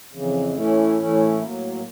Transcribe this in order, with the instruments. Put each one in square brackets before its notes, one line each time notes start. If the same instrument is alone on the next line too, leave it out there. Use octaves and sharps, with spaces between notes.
[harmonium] F2 C#3 E3
A2 E3 A3 C#4 E4
A2 E3 A3 C#4 E4
A2 F#3 A#3